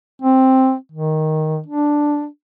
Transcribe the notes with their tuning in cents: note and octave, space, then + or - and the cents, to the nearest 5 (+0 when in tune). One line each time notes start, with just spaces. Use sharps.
C4 +5
D#3 +5
D4 +0